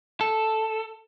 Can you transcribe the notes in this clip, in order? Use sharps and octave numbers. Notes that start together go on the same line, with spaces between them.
A4